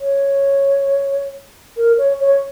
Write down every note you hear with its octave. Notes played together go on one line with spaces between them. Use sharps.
C#5
A#4
C#5
C#5